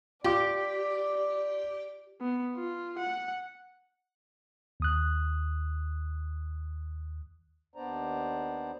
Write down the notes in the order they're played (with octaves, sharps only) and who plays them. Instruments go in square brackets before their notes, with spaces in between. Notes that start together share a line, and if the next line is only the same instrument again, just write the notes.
[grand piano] F4 D6 [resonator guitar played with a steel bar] G4 [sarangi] D5
[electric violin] B3
F4
F#5
[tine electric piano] D#2 D#6 F#6
[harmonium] D#2 B3 D4 C5 D5 A#5